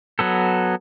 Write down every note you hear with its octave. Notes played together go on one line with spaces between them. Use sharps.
F#3 B3 A4